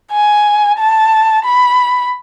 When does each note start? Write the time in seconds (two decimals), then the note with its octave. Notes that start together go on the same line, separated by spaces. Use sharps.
0.12 G#5
0.79 A5
1.45 B5